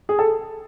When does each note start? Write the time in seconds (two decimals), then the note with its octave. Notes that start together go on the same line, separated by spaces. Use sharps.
0.09 G#4
0.19 A4